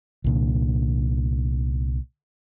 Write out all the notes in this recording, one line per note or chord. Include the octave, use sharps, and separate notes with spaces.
C2 A#2 D3